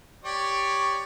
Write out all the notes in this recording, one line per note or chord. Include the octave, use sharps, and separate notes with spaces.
G4 C#5 D5